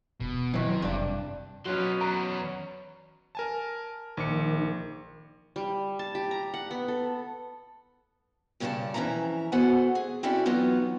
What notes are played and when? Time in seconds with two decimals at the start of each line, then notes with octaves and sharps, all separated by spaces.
0.20 E1 B2
0.54 C3 D#3 E3 F#3
0.82 F#1 G2 D4
1.65 B2 F#3 A#3 C#4 F#4 C6
2.01 E2 B4 C#5 A#5
3.35 A#4 G#5 A5
4.17 A#1 D#3 D6 C#7
5.56 G3
5.99 A5
6.15 G4
6.31 A#5
6.54 F#5
6.71 B3
6.88 A4
8.60 G2 C#3 C#4 A4 D5 A5
8.94 F2 E3 C#4 F#4 E5 A#5
9.52 B3 F#4 A4 C5 F#5 G#5
9.95 G#4
10.23 C4 C#4 E4 F#4 A4 D5
10.46 E3 F#3 B3 D#4 F4